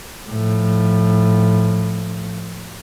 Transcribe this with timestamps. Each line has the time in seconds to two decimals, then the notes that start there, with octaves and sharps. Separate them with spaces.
0.31 A2 F3